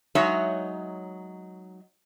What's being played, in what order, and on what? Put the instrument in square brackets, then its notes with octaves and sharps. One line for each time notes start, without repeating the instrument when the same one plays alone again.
[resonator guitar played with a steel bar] F#3 G#3 D#4 C#5 E5